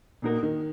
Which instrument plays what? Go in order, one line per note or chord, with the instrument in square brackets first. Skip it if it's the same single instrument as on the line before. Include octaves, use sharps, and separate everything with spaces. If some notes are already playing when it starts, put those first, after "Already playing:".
[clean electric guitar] A#2 A#3 D#4 F#4 A#4
[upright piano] D#3